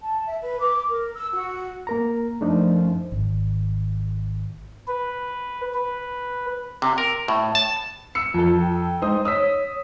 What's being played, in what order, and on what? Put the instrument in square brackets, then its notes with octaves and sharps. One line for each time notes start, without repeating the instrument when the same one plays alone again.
[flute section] A5
E5
B4
D6
A#4
E6
F#4
[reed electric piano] A#3 A#4 A#5
[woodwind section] F#2 F3 [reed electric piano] A3 D4 D#4
[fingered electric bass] G#1
[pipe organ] B4
B4
[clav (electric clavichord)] C3
A#4
A2
A5
[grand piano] E6 C#7
[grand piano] F2 A4 [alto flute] F4
[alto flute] G5
[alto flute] G#3 [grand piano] D#4 C5 D#6
[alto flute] C#5 [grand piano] D#6 E6 B6